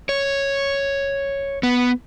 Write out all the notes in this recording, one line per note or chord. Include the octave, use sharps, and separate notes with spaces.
C#5
B3